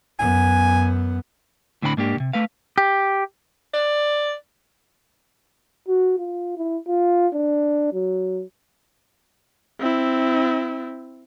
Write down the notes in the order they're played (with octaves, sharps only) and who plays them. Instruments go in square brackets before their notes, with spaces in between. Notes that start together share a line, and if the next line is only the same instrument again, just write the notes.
[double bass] F#2 B3 [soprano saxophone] G#5
[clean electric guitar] A2 D3 C4 D4 G5 B5
G#2 A#3 D4 G4
C#2 C3
A3 B4 F5
[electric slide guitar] G4
[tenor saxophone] D5
[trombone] F#4
F4
E4
F4
D4
F#3
[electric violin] C4 E4